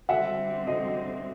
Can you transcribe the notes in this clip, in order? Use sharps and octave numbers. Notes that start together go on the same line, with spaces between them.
D3 G3 C4 E5 F#5
D#5